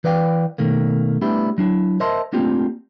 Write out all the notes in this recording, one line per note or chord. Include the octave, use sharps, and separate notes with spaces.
E3 B4 D5 F5 G5
B2 D#3 A3 A#3
G3 A3 B3 D4 E4 G4
F#3 D4 E4
A#4 C5 D#5 E5 A5 C6
A3 A#3 C4 D4 F4 G4